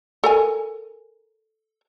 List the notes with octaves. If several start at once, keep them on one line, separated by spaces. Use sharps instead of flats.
A4 A#4 G#5